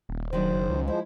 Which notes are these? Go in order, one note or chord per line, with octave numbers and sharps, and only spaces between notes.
D#1
D#3 F#3 D4 C5
F#1
C#2
F3 G#3 E4 C5